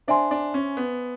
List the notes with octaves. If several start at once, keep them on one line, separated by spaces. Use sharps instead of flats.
D4 C5 E5 G#5 C6
D4
C#4
B3